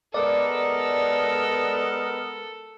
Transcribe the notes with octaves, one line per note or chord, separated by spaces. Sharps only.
G#3 B3 A4 A#4 D5